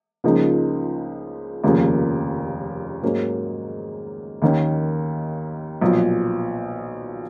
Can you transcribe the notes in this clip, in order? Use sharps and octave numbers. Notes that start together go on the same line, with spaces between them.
C#2 C#3 F3 A#3 D#4
F1 D#2 C#3 F3 A#3
G#2 F#3 A#3 C#4
D#2 D#3 A#3 C#4
B1 A#2 F3